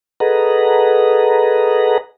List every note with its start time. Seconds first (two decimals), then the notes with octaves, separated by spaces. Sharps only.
0.20 G#4 A4 B4 D#5 F#5 A#5